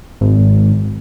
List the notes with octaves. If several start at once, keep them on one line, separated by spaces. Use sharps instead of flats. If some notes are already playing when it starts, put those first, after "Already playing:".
G#1